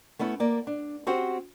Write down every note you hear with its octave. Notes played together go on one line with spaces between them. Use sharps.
A3 B3 C#4 E4
A#3 D5
D4
C4 C#4 F#4 G4 C5